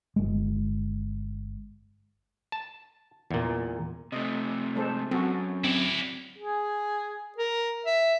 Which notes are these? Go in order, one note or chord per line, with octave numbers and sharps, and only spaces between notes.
G1 G#3
A5
E2 A#2
C3 A3 D#5
G#3 A4 C5
F#2 C4 F#4 A4
C4 E4 D5
G#4
A#4
E5